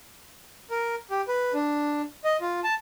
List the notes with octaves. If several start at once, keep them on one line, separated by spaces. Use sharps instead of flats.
A#4
G4
B4
D4
D#5
F4
A5